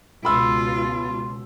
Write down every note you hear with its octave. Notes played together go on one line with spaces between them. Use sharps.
C#2 B2 F4 B5 C6 E6